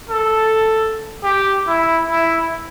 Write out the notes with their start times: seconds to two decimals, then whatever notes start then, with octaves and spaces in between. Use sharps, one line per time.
0.09 A4
1.24 G4
1.67 E4
2.10 E4